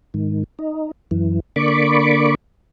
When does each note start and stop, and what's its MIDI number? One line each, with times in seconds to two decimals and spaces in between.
0.14 0.44 44
0.14 0.44 51
0.59 0.91 63
1.11 1.40 42
1.11 1.40 52
1.56 2.35 50
1.56 2.35 58
1.56 2.35 74
1.56 2.35 83
1.56 2.35 85
1.56 2.35 86